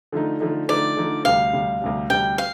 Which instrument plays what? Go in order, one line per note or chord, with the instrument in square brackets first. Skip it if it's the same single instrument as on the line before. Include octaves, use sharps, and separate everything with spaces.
[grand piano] D3 F3 A3 D#4
D3 F3 A3 D#4
[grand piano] D3 F3 A3 D#4 [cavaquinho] D5
[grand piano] D3 F3 A3 D#4
[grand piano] D2 C3 G3 [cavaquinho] F5
[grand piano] D2 C3 G3
D2 C3 G3
[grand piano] D2 C3 G3 [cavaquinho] G5
[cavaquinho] F5